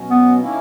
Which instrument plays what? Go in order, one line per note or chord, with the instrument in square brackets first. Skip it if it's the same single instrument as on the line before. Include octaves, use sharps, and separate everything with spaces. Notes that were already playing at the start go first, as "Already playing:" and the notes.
Already playing: [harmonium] B2 F#3 C#4
[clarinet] B3
[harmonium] D#3 A#3 C#4 E4